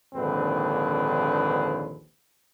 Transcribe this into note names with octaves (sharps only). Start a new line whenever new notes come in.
A#1 D#2 G#2 D3 C4 B4